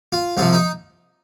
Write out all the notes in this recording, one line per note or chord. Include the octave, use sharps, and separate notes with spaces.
F4
C2 C3 F3 F4
D#4